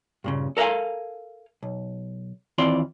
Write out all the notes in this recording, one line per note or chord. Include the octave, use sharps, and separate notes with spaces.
G2 A#2 C#3
A4 A#4 E5 F5 G#5
B1
D#2 E3 C4 F4 D5 C6